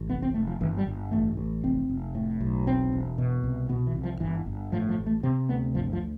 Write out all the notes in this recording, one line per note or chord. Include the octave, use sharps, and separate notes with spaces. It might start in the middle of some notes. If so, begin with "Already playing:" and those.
Already playing: A1
F1 B3
C4
F1 A3
F3
G1 E3
G3
G1
A1 A3
A1
F1 C4
F1
A2
B1
E1 C4
E1
B2
C2
B2 B3
E3
C2
F3
G1 E3
G1
A2 F3
F3
A1
A3
C3 C4
D2 B3
G1 F3
F3